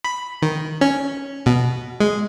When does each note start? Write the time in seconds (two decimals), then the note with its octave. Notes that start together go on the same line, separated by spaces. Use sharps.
0.04 B5
0.42 D#3
0.81 C#4
1.46 B2
2.00 G#3